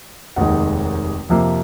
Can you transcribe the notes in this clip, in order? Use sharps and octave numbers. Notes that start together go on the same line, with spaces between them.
F1 D#2 D#3 G#3 F#5
F2 C3 F3 A#3